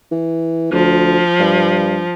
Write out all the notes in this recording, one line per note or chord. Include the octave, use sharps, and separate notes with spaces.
E3
D2 F3
G2